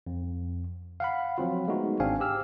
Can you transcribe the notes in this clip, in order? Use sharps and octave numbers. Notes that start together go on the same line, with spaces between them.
F2
F5 F#5 B5
F3 F#3 C4 F4
G#3 A3 B3 D#4 F#4
G#1 C4 D4 F5 G#5
G4 E6 F6